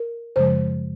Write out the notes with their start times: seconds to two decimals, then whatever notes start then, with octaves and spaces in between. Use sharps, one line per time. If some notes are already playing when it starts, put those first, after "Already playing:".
Already playing: A#4
0.36 F#2 C#3 F3 G#3 C5